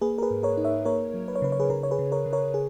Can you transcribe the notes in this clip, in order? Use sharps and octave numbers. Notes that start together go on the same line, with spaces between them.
A#3 G#4 B4
A#4
G#4 B4
G#2
A#4 C#5
D#4
C#5 E5
A#3 A#4 C#5
F#3
B4
C#5
C#3 B4
C#5
G#4 B4
C#3 A#4
C#5
G#4 B4
C#3
A#4 C#5
C#3
A#4 C#5
G#4